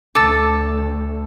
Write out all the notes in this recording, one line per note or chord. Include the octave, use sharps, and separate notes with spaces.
D2 A4 D6 E6 A6